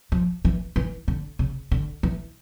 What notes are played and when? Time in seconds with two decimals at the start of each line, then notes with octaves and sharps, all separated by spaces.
0.12 F3
0.45 E3
0.76 E3
1.08 D3
1.39 C#3
1.71 D3
2.03 E3